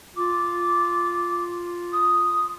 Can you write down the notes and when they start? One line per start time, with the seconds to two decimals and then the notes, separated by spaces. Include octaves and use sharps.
0.16 F4 D6
1.92 D#6